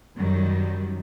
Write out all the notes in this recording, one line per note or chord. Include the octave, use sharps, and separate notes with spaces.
F#2 D#3 F#3 G3